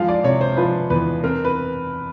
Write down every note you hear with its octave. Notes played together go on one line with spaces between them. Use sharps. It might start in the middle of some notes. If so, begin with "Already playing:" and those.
Already playing: F3 G#3 F5
D5
C3 C#5
C5
F3 B4
E2 B4
C4 A#4
B4